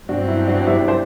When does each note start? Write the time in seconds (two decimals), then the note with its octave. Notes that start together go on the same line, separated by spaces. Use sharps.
0.09 G2 F#3 C4 D4 F#4
0.28 E4
0.47 D4 F#4
0.66 E4 G4
0.81 D5
0.88 C5